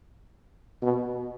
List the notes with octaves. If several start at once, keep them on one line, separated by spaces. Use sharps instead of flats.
B2